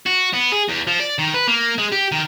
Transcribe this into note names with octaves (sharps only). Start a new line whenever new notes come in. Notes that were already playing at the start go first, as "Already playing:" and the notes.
F#4
B3
G#4
E2
F3
D5
D#3
B4
A#3
G#3
G4
D#3